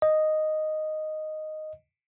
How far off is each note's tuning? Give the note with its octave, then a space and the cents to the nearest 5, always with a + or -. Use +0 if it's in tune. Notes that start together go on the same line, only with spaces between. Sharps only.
D#5 -5